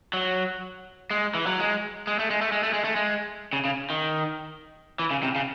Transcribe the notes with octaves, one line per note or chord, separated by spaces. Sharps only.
F#3
G#3
E3
F#3
G#3
G#3
A3
G#3
A3
G#3
A3
G#3
A3
G#3
C#3
C#3
D#3
E3
C#3
C3
C#3